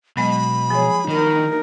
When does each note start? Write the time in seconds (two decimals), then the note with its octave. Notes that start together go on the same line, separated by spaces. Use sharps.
0.17 B2 F#3 G#3 D#5 B5
0.70 F3 G#4 C#5
1.08 D#3 D#4 A#4